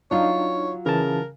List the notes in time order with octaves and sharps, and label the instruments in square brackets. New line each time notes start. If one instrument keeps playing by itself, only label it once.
[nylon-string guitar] F#3 F4 [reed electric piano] D4 D#4 F5 [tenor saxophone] C#5
[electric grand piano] C#3 [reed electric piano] E3 A5 [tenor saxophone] A#4